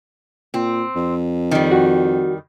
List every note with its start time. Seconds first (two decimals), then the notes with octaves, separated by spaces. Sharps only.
0.54 A#2 C4
0.96 F2
1.51 D#3 G3
1.72 F#4